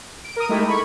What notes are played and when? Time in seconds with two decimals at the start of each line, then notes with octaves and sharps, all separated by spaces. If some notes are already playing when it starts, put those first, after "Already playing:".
0.24 D7
0.36 A#4 D#6
0.49 G#3 A3 D#4 E4 G4
0.67 B5 C#6 G#6